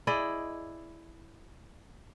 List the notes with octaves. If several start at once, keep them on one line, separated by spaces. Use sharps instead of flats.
E4 G#4 D5 D#5